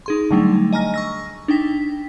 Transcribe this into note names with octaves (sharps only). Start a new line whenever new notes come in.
D#4 G#4 C6
D3 F#3 G3 A3 D4 D#4
D#5 G#5 A#5 F6 A#6
C#6 E6 A#6
D4 D#4 G5 B6